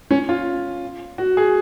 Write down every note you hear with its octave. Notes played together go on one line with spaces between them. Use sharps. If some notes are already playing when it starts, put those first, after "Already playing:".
C#4
F4
F#4
G#4